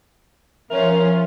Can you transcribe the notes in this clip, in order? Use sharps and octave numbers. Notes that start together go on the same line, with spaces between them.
F3 C#4 F4 A#4 C#5 E5